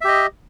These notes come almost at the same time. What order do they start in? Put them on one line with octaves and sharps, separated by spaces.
E5 G4 D#5